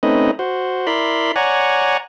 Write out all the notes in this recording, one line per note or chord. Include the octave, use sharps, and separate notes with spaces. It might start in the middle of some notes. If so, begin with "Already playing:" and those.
A3 C4 C#4 D#4 B4 D#5
F#4 C5
E4 A#4 D5 B5 C6
C#5 D5 F#5 G#5 A#5